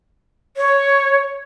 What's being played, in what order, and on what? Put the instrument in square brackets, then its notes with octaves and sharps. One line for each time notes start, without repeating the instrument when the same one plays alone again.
[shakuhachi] C#5